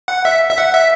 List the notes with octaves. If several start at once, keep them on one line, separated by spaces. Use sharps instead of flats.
F#5
E5
E5
F#5
E5